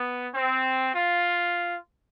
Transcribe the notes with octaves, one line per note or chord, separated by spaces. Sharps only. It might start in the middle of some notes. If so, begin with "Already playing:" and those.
Already playing: B3
C4
F4